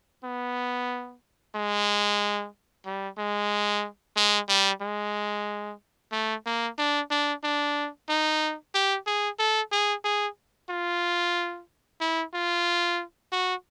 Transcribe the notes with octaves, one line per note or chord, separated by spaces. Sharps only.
B3
G#3
G3
G#3
G#3
G3
G#3
A3
A#3
D4
D4
D4
D#4
G4
G#4
A4
G#4
G#4
F4
E4
F4
F#4